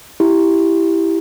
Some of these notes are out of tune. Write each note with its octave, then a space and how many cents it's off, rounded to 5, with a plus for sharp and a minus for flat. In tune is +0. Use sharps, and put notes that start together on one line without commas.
E4 +0 G4 +0